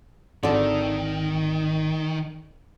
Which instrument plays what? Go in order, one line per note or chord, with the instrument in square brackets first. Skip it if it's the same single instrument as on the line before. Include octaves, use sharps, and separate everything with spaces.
[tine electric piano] G#1 [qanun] D3 A4 [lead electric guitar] D#3